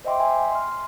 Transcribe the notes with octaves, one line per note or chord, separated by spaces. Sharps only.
C5 D#5 E5 G5 C6 D6
E5 G#5 C6
C6 F6